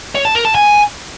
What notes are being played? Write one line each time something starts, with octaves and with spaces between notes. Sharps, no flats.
C#5
A5
A#4
A5
G#5